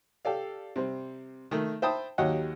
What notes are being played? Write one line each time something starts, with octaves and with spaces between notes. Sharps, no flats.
G4 A4 D5 F5
C3 G3 C4
D#3 A3
C5 E5 G5 A5 B5 D#6
D#2 F#3 G4 C#5 D#5 F#5